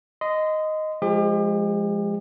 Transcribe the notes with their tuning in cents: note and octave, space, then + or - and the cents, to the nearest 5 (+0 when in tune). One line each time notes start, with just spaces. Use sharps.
D#5 +0 C6 -30
F3 +0 G#3 +0 G4 +40